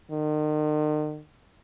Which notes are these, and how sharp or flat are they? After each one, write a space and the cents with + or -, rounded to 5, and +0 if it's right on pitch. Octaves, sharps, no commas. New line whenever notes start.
D#3 -40